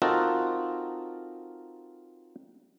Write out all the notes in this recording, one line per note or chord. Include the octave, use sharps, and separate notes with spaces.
C4 D#4 F4 F#4 A4 A#4